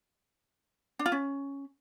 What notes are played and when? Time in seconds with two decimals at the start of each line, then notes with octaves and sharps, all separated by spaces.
0.99 D4
1.06 F4
1.12 C#4